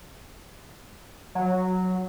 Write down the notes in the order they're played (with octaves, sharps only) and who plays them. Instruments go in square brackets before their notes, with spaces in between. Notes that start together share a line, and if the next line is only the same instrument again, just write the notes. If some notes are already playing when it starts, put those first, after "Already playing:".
[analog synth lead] F#3